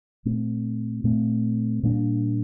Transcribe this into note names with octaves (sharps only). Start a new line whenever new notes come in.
A#2 A3 C4
A#2 A3 C4
A#2 G3 A#3 D4